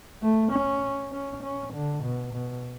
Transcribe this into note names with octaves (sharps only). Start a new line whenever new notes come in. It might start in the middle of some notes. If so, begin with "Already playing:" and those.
A3
C#4
C#4
C#4
D3
B2
B2